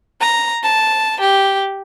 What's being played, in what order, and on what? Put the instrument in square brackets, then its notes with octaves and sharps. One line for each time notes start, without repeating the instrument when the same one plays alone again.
[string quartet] A#5
A5
G4